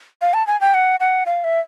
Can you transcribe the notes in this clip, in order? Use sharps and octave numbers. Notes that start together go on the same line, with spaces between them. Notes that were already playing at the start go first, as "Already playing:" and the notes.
F5
A5
G#5
G5
F#5
F#5
F5
E5